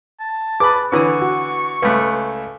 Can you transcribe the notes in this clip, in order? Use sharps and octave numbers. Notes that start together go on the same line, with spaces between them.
A5
G#4 B4 B5 D6
D3 E3 B4 C#5 C#6 D#6
F#4
C#2 A3 B4